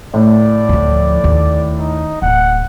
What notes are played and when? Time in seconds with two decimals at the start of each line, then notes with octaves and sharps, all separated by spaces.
0.14 A2 D5
0.69 D2 F3
1.24 D#2
1.79 D#4
2.22 D1 F#5